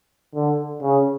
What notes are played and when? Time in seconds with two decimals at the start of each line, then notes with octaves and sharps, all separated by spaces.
0.35 D3
0.82 C#3